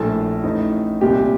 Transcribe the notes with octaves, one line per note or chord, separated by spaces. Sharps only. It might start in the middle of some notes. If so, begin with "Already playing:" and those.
Already playing: A#1 A2 A4
A1 A2 D#4
C2 A#2 G4